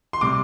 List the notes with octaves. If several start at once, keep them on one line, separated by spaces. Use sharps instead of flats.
C6
C3 G3 D6